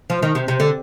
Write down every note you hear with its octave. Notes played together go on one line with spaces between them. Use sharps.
F3
D#3
C3
C3
D3